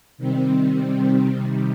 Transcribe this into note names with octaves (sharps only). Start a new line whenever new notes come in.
C3 D#3 G3 C4
C3 D#3 G3